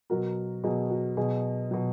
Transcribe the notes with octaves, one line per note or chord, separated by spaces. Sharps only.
B2 F#3 F#4 A#4
B2 F#3 G#4
F#4
B2 F#3 G#4
B2 F#3